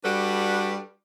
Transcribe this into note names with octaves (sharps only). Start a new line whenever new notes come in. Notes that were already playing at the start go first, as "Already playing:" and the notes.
G3 D4 F#4 A4 B4